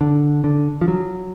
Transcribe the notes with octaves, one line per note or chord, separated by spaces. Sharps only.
D3
D3
F3
F#3